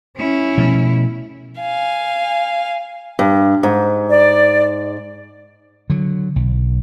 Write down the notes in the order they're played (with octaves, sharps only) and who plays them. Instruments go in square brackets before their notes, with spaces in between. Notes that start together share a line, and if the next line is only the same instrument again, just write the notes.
[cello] C#4 E4
[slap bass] B2 F3 A3
[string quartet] F5 G#5
[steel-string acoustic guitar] G2
G#2
[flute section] D5
[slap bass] D3 F#3
B1